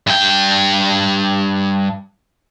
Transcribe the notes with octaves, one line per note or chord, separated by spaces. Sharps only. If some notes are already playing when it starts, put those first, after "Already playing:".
G2 G5